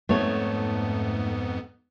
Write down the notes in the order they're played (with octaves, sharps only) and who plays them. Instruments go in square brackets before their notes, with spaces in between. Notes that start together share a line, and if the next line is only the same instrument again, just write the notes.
[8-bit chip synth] F2 G#2 B3 [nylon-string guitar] A3 C#5